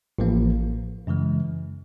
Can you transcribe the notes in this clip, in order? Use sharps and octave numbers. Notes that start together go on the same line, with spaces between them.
A1 A2 F3 A#3
F#2 C#3 E3 G#3